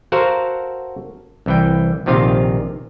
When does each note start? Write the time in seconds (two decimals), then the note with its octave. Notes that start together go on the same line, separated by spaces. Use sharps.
0.12 F#4 A4 A#4 C5 F5 F#5
1.46 C2 E3 G5
2.06 A#1 C3 D#3 F4 F5